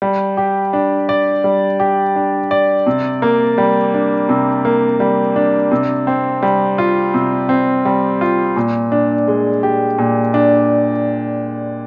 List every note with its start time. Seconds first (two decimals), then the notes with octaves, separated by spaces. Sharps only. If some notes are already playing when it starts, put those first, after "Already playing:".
0.02 G3
0.37 G4
0.73 D4
1.09 D5
1.44 G3
1.80 G4
2.16 D4
2.51 D5
2.87 C3
3.22 A#3
3.58 G3
3.94 D4
4.29 C3
4.65 A#3
5.00 G3
5.36 D4
5.72 C3
6.07 C4
6.43 G3
6.78 F4
7.14 C3
7.49 C4
7.85 G3
8.21 F4
8.56 A#2
8.92 D4
9.28 G#3
9.63 G4
9.98 A#2
10.34 D4